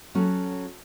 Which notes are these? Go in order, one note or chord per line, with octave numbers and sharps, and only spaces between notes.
F#3 C#4 F#4 A4